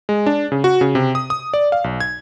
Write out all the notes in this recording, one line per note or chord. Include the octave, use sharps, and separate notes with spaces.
G#3
D4
C#3
F#4
C#3
C3
D#6
D#6
D5
F5
B1
G#6